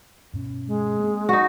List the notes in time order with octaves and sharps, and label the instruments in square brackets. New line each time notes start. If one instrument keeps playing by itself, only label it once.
[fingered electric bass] G2 B2 C#4
[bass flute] G#3
[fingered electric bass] A#3 C4
[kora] D#4 F#4